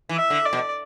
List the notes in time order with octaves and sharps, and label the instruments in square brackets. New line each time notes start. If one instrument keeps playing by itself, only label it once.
[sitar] E3
[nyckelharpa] E5
[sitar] D3
[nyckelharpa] D5
[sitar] B2